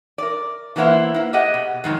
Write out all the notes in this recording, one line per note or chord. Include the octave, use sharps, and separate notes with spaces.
A#4 D5
E3 G3 A#3 B3 E4 C5
A#3 E4
G4 G#4 D#5 F#5
B2
F2 G#2 D#3 F#3